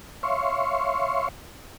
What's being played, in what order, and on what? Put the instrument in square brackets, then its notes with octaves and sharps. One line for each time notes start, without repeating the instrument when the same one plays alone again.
[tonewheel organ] C#5 E5 F5 C6 C#6